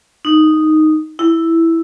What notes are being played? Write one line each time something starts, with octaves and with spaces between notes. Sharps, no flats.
D#4
E4